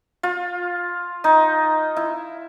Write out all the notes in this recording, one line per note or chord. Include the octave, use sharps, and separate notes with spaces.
F4
D#4
E4